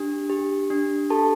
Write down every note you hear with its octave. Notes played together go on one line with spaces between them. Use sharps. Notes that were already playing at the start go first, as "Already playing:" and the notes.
Already playing: D4 G4
G4
D4
G4 A4 A5